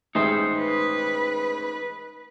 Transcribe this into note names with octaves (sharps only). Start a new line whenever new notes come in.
A1 G#3 D#4 C5 E5
B4